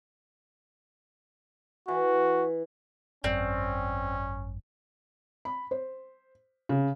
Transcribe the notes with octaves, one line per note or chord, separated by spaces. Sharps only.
E3 F#4
G#1 F#2 C4 C#4 D5
B5
C5
C#3